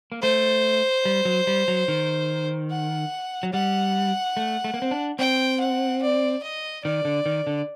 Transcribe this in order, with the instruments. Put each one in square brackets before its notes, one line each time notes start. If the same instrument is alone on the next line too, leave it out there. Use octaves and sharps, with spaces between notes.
[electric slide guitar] A#3
[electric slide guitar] A3 [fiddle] C5
[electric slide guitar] G3
F#3
G3
F#3
D#3
[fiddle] F#5
[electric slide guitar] F#3
[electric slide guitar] G3 [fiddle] F#5
[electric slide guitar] A3
A3
A#3
C4
D4
[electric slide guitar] C4 [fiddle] G5
[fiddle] F#5
D5
D#5
[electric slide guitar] D#3 [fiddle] D5
[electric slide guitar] D3
D#3
D3